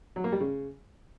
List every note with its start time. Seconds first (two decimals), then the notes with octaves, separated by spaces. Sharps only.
0.16 F#3
0.24 A#3
0.32 G3
0.41 C#3